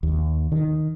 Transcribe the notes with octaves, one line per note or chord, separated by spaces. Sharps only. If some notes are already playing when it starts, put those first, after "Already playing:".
D#2
D#3